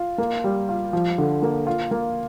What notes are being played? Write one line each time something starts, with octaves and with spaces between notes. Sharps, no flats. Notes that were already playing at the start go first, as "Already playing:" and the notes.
Already playing: F4
A#3
G3
F4
F3
D3
A#3
F4
A#3